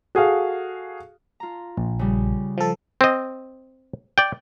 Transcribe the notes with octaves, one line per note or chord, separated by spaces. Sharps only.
F#4 G#4 A4 F5
F4 A#5
A#1
C#3 G3
F3 A4
C4 D#5
D5 G5